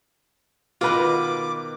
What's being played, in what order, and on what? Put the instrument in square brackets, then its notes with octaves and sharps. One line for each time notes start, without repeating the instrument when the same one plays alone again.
[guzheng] B2 D#3 [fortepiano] F4 B4 [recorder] D6